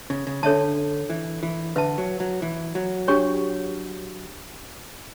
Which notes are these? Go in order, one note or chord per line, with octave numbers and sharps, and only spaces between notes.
C#3
C#3
D3 D4 A4 C#5 E5 A5
E3
E3
D3 B4 E5 A5
F#3
F#3
E3
F#3
D4 G4 C#5 G5 C#6